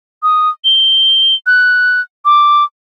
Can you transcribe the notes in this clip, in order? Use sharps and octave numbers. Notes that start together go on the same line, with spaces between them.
D#6
G7
F#6
D6